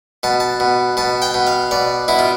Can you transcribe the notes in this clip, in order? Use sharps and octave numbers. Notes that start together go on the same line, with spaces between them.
B2 A5
A5
B2
B2 A5
G5
B2
F5
B2 D5
B2 E4
F4